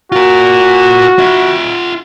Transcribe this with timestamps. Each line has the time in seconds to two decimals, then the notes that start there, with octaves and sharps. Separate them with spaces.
0.12 F4 F#4 A#4
1.19 F4 E5